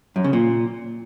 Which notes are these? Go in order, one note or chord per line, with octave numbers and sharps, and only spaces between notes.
F#2
C#3
A#2